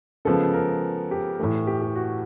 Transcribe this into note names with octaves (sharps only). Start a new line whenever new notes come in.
C#3 F3 G#3 B3 A4
A#4
G4
A2 E3 A3
G4
G4
F#4